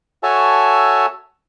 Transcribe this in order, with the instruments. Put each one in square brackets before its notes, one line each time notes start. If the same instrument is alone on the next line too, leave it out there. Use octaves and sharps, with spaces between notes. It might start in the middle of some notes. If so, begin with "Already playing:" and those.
[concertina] F#4 A4 C#5 E5 G#5 A5